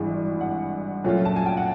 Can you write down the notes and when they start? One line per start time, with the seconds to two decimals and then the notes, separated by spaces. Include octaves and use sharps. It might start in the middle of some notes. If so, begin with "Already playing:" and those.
Already playing: G#1 G2 E3 G#3
0.41 F#5
1.04 A#2 F#3 A3 C#4 F4
1.25 A5
1.36 G#5
1.46 G5
1.57 F#5